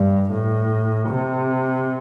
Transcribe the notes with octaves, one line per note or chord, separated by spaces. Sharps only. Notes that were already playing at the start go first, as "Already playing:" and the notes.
Already playing: G2
A2
C3